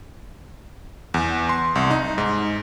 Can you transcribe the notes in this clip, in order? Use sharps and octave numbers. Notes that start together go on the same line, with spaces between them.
E2
C6
C2
D#4
G#2